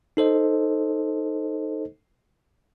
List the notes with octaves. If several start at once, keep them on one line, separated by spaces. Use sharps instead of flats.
D#4 A4 C5 D#5